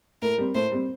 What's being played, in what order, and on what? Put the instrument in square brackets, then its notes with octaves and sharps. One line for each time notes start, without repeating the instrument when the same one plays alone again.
[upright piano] A2 [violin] A#4
[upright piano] G3 C4
[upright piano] A2 [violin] C5
[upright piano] G3 C4